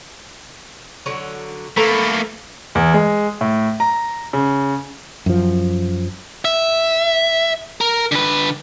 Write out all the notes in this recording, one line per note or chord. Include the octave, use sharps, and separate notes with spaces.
D3 F#3 C#5
A3 A#3 A4 B4 A#5
E2
G#3
A2
A#5
C#3
F#2 F3
E5
A#4
D3 B4